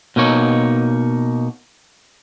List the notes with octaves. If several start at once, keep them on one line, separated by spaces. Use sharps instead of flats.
B2 A#3 D#4 C#5